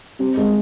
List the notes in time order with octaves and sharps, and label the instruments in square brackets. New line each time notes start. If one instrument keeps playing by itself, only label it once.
[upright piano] G3 [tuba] C4
[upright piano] G#3